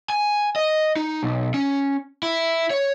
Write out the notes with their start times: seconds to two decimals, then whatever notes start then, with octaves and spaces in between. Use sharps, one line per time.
0.10 G#5
0.56 D#5
0.96 D#4
1.23 B1
1.54 C#4
2.23 E4
2.70 C#5